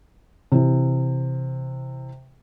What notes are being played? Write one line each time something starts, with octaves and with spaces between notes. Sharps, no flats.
C3 E3